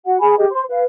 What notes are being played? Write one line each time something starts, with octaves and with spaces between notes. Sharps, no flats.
F#4 F#5
G#4 G#5 B5
G4 G#4 D#5
C5 C6
B4 F5